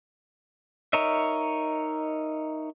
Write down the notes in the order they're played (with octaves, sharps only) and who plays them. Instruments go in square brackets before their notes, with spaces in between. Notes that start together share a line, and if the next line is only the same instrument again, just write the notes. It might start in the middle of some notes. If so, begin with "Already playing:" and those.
[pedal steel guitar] D#4 A#4 C#5 D#5 E5